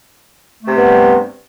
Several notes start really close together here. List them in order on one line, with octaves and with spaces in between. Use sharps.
A3 C3 B3 G2 G3